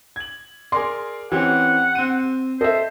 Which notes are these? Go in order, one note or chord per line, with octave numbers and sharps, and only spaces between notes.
G#6 F#7
G#4 A#4 D5 C6
E3 C4 C#4 G4 F#5
C4 D#7
A4 C5 D#5 E5